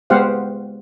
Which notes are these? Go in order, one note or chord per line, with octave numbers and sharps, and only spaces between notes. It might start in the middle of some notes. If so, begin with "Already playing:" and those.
G#3 B3 G4 C5 F5 F#5